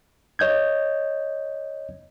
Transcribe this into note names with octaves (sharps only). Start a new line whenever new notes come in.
C#5 D#5 G6 G#6